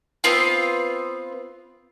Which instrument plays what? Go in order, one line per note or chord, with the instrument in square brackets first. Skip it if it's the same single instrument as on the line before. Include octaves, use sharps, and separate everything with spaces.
[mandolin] B3 C4 F4